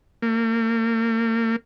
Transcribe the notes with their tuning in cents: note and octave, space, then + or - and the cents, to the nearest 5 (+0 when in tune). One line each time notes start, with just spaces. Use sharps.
A#3 -40